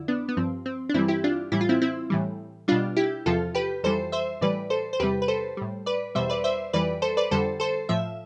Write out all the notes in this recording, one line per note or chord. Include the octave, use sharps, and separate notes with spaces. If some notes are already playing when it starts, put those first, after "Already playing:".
Already playing: F2 D3 E4
B3 D4
B3
G2 F3 C4
C4
D4
G2 E3 G3 C4 E4
E4 G4
D4 F4
A2 E3 G3 E4
F4
C4 E4
C4 E4
A2 E3 G3
B2 G3 D4 F4
E4 G4
E2 C3 F3 F4 A4
G4 B4
F2 E3 G3 A4 C5
C5 E5
A2 E3 G3 B4 D5
A4 C5
C5
E2 C3 G3 G4 B4
B4
A4 C5
A2 G3
B4 D5
E2 B2 G3 C5 E5
B4 D5
C5 E5
F2 E3 G3 B4 D5
A4 C5
B4 D5
F2 D3 G3 A4 C5
A4 C5
A2 F3 E5